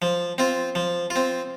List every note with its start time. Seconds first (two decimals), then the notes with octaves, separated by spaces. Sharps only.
0.02 F3
0.38 C4 F4
0.75 F3
1.10 F4
1.16 C4